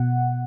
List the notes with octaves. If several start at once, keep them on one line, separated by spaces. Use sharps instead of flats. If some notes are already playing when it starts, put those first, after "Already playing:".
Already playing: B2 F#5